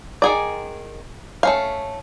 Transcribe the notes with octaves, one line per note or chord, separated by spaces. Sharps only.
D#3 G#4 D5
A3 C#4 F5